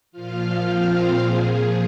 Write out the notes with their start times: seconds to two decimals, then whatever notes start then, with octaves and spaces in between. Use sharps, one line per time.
0.12 A#2 F3 F4 F5
0.64 C4 C5
1.16 A#2 F3 G#4